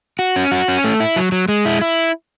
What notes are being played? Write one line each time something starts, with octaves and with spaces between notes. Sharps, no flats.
F#4
C#4
F#4
C#4
A3
E4
F#3
F#3
G#3
E4
E4